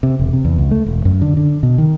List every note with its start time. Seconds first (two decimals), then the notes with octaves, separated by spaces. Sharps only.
0.03 C3
0.19 E1
0.33 C3
0.45 E2
0.58 C#2
0.71 A3
0.86 E1
1.05 F#2
1.22 D3
1.37 D3
1.63 B2
1.78 D#3